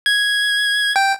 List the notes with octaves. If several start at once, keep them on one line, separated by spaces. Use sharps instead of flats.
G#6
G5